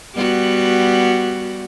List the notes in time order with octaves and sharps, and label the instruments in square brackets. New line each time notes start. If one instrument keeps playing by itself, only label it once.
[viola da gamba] G3 B3 F#4